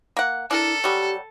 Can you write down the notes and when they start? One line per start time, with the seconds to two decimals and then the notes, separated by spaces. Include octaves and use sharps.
0.17 A#3 F#5
0.51 D4 E4 A4 A#4
0.84 F#3 G3 G4